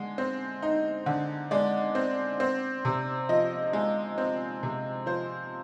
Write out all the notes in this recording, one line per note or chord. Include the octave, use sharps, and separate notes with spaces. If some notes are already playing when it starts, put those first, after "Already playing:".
Already playing: D3 G#3
C4
D#4
D3
G#3 D5
C4
C4
C3
F3 D#5
G#3
C4
C3
F3 C5